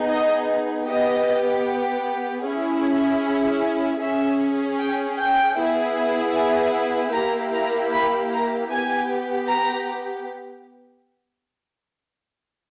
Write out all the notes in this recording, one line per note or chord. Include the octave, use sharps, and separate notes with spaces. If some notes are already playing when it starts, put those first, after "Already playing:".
Already playing: B3 D#4 G#4
D#5
B3 G4 D#5
C#4 E4 G#4
C#4 G#4 E5
G5
G5
B3 E4 G#4
G#5
A#3 E4 G4 A#5
A#5
B5
A#5
B3 G4 G#5
A#5